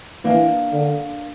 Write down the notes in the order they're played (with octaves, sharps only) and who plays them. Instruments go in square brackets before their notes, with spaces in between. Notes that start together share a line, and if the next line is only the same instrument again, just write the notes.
[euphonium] E3 [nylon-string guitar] A#3 D4
[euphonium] D3